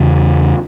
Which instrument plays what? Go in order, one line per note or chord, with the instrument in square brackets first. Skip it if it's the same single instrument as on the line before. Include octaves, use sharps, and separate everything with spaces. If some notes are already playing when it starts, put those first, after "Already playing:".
Already playing: [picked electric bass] E2 C#3